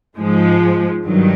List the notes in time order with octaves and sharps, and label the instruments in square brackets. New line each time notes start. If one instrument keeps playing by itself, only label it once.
[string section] G#2 F3 G#3
G2 D#3 F#3